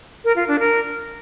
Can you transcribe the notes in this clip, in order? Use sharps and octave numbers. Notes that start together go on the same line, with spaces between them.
A#4
F4
D4
A#4